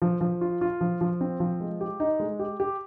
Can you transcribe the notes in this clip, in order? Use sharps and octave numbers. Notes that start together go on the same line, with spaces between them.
F3
F3
F4
F4
F3
F3
C4
F3
G#3
G4
D#4
G#3
G4
G4